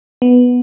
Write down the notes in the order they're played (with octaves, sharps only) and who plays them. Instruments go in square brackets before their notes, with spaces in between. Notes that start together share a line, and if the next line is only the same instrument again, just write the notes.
[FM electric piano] B3